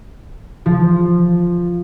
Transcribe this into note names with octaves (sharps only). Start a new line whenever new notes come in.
F3